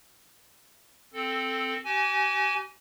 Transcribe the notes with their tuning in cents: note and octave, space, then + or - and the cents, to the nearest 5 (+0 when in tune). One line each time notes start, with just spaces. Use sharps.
C4 +0 A4 +0
G4 -40 G#5 +0